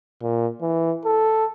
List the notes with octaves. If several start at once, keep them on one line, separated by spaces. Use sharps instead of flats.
A#2
E3
A4